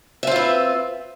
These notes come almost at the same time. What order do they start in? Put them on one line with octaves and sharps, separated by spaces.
E5 C4 F4 B4